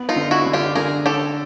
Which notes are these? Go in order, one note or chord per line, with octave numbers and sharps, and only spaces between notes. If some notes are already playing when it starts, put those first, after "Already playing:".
Already playing: B3
D#4 F4
D3
E4 F#4
D3
F4 G4
D3 G#4 A#4
D3 G4 A4